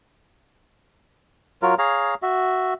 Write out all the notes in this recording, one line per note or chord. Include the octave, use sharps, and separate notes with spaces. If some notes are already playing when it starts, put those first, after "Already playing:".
F#3 F4 A#4
G#4 C#5 F5 A#5
F#4 E5